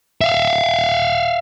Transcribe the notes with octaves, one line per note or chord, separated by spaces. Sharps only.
E5 F5